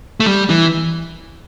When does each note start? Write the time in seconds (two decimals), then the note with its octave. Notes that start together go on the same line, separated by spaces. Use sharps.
0.20 A3
0.26 G3
0.49 E3